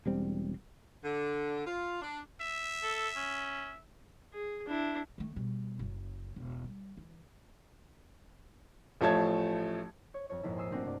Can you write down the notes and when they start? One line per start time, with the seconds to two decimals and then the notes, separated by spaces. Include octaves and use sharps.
0.06 E1 G3 C4
1.04 D3
1.66 F4
2.02 D4
2.41 E5
2.83 A4
3.17 C#4
4.33 G#4
4.68 D4 E4
5.18 D#3 A3
5.36 B2 G3
5.79 F#1 C#3
6.36 E1 C#3
6.64 G3
6.97 E3
9.01 A1 F3 A3 C#5 A5 G#6
10.14 C#5
10.30 F2 A4 C#5
10.43 A#1 F2 G#2 E4 A4 E5
10.57 G#5 C6 D#6 E6 C7
10.71 A3 A#3 C4 D4 D#4 F#4
10.83 C2 G2 D5